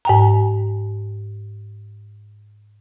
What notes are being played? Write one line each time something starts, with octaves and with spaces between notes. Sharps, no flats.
G#2 G5 A#5